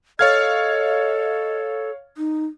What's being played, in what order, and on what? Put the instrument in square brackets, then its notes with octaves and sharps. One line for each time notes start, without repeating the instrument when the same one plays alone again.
[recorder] A4 [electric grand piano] C#5 F5 G#6 [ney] D#5 [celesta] F6 A6
[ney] D#4